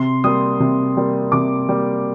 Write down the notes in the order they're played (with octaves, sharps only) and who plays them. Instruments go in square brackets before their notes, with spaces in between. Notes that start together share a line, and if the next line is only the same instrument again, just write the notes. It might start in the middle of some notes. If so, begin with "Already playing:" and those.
Already playing: [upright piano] C3 C6
G3 A#3 D#6
C3
G3 A#3
C3 D6
G3 A#3